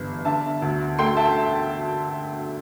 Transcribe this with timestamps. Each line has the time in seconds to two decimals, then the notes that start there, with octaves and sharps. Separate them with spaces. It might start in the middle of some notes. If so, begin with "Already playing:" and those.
Already playing: G1 G2 E3
0.25 D3 E5 A5
0.62 D2
0.98 A3 G5 C6
1.17 E5 A5